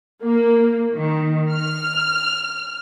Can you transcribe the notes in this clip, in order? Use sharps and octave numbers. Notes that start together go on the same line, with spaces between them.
A#3
D#3
F6